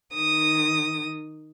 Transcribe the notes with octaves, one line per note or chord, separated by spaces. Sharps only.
D#3 D#6